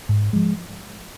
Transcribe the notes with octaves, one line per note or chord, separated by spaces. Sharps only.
G#2
F3 G#3